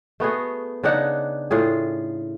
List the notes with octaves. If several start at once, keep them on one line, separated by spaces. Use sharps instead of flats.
A3 B3 F#4 G#4
C#3 D4 D#4 F#5
A2 F4 G#4